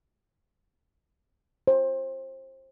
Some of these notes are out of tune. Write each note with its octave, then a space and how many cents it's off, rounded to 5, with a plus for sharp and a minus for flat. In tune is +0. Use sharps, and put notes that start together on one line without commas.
C5 +25